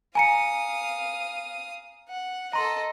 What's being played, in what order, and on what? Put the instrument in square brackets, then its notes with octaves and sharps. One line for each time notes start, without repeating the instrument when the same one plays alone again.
[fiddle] F5 D#6 [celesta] G#5 A#5 C#7
[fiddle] F#5
[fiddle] A4 D#5 [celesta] A#5 C6